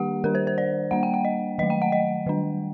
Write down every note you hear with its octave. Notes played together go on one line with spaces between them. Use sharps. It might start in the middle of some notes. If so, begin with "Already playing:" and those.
Already playing: D#3 G3 A#3 D4 G4 F#5
D#3 G3 D4 A#4
C5
C5
D5
G3 A#3 D4 F#5
G5
F#5
D#5
D#3 F#3 A3 D#5
G5
F#5
D#5
D#3 G3 D4